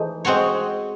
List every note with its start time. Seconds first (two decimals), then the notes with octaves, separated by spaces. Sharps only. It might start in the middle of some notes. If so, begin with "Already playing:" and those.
Already playing: E3 A3 D#4 G#4 C5
0.25 G#3 C4 F#4 C#5